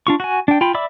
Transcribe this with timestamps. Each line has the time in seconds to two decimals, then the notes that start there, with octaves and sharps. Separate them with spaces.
0.07 D4 F4 C#6
0.20 F#4 G#5
0.48 D4 G5
0.61 F4 G5 B5
0.74 D5 E5 B5 D6 E6